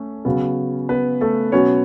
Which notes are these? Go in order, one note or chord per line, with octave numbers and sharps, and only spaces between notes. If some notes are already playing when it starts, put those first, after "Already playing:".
Already playing: A3 C#4
C#3 F#3 B3
B3 B4
A3 A4
B2 F#3 B3 C#4 C#5